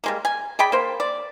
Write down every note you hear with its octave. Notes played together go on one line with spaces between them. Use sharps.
G3 G#3 A#3
G#5
G#4 D5 G5 B5
A#3 C5
D5